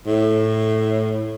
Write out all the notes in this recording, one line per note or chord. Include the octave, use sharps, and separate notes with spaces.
A2